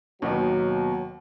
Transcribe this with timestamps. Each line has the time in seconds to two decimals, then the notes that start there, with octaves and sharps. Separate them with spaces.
0.22 D#2 B2 F#3